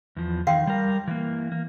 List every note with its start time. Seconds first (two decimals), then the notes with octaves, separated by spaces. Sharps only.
0.16 E2 F3
0.47 D#3 F5 G5 C6
0.67 G3 A#4
1.08 E3 A#3
1.52 A#3